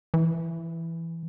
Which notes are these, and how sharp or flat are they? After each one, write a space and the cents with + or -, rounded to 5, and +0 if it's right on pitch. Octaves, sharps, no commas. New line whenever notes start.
E3 +10